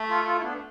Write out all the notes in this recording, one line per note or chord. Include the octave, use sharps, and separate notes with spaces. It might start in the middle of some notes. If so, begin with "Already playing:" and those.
Already playing: A3
F4 A4
F4 A4
E4
B3 D4